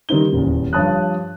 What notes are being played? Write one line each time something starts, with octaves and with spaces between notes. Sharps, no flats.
D#3 G3 C4 D#4 G7
D#1 E2
G2 F3 C#5 A5 D#6 F#6